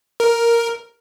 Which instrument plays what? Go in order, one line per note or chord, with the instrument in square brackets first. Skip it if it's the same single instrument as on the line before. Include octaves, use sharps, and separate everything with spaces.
[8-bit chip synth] A#4